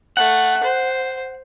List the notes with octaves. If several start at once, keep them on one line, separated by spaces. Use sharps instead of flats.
A3 F#5
C5